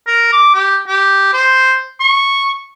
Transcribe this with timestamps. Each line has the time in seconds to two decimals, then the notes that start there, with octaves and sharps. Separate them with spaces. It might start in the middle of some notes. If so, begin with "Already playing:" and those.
0.07 A#4
0.32 D6
0.54 G4
0.88 G4
1.33 C5
2.00 C#6